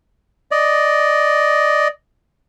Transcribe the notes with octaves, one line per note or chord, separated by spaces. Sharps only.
D5 D#5